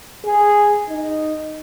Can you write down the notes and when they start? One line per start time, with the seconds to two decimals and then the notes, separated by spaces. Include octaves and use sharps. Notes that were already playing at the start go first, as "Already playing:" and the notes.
0.25 G#4
0.89 D#4